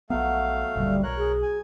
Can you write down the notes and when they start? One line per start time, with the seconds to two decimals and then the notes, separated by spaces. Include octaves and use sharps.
0.10 A#1 F#3 A3 B3 F5
0.76 F#1 D2 A#2 G3
1.03 B1 A#4 C#5 F#6
1.18 G#4
1.42 G#5